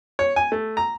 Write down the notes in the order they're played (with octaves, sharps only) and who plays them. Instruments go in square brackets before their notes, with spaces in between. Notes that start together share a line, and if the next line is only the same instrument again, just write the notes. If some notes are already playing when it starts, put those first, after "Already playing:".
[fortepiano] C#5
G#5
A3
A#5